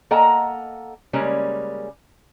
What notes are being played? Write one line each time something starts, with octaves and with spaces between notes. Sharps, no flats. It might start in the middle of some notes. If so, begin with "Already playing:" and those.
A#3 A4 D#5 F#5 G#5 A#5
C#3 G3 G#3 A#3 C#4